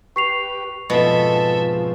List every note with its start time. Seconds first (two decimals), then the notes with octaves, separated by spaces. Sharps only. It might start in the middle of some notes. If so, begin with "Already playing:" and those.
0.16 G4 B4 C#6 C7 F7
0.90 F2 G#2 B2 F3 A4 E5